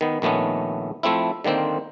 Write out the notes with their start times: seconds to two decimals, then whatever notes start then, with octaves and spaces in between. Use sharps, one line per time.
0.01 D#3 B3
0.22 A#1 D#3 A3 B3 C#4
1.03 F3 A3 C4 E4
1.44 D3 D#3 A#3 C4 C5